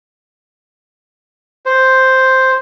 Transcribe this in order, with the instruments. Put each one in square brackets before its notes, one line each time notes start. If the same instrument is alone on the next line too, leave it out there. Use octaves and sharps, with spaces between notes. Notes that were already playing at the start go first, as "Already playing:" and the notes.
[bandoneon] C5